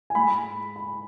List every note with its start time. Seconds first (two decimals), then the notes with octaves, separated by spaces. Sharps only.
0.10 G#5
0.15 G#2 G#3 B5
0.76 B5